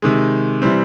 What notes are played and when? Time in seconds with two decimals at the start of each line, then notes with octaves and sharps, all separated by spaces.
0.02 C3 D#3 G#3
0.62 C3 E3 G3 C4